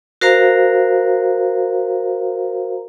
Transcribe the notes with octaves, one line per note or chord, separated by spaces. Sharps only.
F#4 A#4 C5 F5 A#5